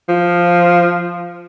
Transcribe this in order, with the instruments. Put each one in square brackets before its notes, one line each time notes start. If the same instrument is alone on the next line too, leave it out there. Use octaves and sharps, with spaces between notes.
[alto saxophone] F3